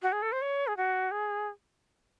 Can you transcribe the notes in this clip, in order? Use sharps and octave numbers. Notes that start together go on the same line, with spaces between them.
F#4
G#4
A4
C5
C#5
G#4
F#4
G#4